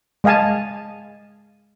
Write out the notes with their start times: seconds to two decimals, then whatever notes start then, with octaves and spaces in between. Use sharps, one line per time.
0.24 G#3 D#5 F5 G#5 A5